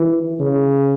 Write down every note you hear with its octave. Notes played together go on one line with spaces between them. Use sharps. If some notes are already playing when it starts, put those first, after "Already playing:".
Already playing: E3
C#3